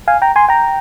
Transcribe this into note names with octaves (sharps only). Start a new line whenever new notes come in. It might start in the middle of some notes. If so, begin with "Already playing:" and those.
F5 G#5
G5 A#5
G#5 C6
G5 A#5